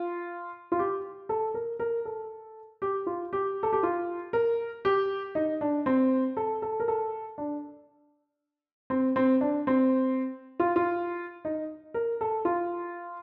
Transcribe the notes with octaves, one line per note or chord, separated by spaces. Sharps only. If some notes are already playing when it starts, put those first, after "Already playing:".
Already playing: F4
F4
G4
A4
A#4
A#4
A4
G4
F4
G4
A4
G4
F4
A#4
G4
D#4
D4
C4
A4
A4
A#4
A4
D4
C4
C4
D4
C4
F4
F4
D#4
A#4
A4
F4